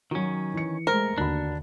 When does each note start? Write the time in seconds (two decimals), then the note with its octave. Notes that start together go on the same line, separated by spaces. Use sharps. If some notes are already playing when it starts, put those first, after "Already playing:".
0.11 D#3 F#3 C#4 F#4
0.54 E3 C#7
0.87 G#3 A3 A#4 C5
1.18 D#2 D3 D4 F#4 B5